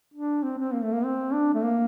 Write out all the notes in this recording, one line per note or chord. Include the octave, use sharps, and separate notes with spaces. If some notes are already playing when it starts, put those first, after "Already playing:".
D4
C4
C4
A#3
A3
A#3
C4
D4
A3
A#3